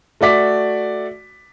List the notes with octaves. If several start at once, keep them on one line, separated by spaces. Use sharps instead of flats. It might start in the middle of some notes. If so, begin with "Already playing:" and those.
A3 F#4 D5 B6